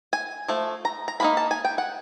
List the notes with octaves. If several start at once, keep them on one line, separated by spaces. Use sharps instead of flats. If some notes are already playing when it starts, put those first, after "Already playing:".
G#5
F3 A3
A#5
A#5
F3 A#3 D#4 B5
A5
G#5
G5
F#5